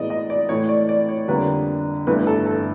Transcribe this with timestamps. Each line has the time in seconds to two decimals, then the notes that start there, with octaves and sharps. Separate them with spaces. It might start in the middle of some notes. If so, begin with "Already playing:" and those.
Already playing: A2 E3 G#3 B3 D5 D#5
0.10 D#5
0.30 D5
0.49 A2 E3 A3 C#5
0.69 D5
0.89 D5
1.09 C#5
1.28 F2 D3 G3 A#3 D4 B4
2.07 G1 G2 E3 A3 B4
2.27 A4
2.47 A4